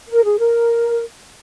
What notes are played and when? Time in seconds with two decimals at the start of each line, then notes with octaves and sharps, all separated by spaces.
0.09 A#4
0.24 G#4
0.39 A#4